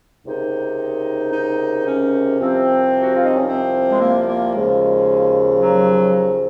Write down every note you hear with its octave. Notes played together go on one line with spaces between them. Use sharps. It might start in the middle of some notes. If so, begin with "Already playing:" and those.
C#2 C3 D#3 D#4
D#4
C#4
C2 C3 F3 C4
F#4
F4
D#4
C#4
C4
G#3
A#3
A#3
D#2 C#3 F3 G#3
F#3